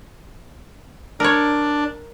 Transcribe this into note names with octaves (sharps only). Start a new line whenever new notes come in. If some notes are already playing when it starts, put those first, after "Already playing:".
D4 A#4 C#5